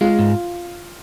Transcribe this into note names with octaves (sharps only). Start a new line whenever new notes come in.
G#3 F4
G#2